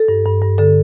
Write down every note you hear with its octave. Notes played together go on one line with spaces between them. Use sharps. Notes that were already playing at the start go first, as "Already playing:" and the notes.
Already playing: A4
G2
G2
G2
D3 A4